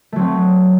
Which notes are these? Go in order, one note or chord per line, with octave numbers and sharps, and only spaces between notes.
F#3 A3 C4